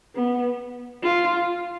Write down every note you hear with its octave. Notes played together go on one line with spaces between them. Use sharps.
B3
F4